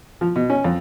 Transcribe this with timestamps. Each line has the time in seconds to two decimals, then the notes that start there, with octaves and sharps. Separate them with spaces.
0.21 F3
0.36 B2
0.50 C#4
0.64 F2